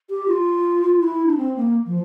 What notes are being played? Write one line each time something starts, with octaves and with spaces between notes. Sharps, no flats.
G4
F4
E4
D4
C4
A#3
F3